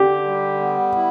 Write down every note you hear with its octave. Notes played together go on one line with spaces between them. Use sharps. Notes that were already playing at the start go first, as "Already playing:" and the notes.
Already playing: D3 G4
G3
B3
E4